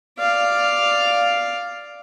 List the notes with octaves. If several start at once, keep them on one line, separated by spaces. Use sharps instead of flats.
D5 F5